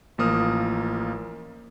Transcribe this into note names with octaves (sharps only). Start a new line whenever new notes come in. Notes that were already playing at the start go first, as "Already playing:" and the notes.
A1 F3 A#3 D#6 F6